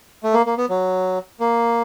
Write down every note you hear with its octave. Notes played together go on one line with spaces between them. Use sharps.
A3
A#3
A#3
B3
F#3
A#3